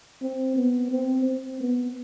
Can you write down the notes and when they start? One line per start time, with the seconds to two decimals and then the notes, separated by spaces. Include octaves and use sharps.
0.22 C4
0.56 B3
0.91 C4
1.25 C4
1.60 B3